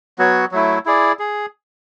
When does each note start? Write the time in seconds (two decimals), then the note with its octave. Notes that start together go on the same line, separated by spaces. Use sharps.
0.19 F#3 B3 F#4 C#5
0.52 F#3 A3 E4
0.85 E4 G#4 D5
1.19 G#4